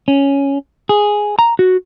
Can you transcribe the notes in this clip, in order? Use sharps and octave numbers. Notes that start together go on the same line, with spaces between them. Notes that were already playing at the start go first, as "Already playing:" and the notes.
C#4
G#4
A#5
F#4